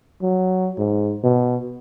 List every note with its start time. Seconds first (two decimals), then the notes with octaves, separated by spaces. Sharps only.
0.22 F#3
0.78 G#2
1.23 B2